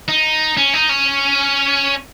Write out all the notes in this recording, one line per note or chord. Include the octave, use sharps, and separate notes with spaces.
D#4
C#4
D#4
C#4